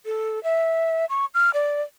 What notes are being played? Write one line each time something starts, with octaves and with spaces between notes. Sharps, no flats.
A4
E5
C#6
F6
D5